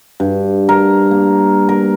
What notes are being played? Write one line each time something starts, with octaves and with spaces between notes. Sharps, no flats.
G2
A#4
A#3
A#4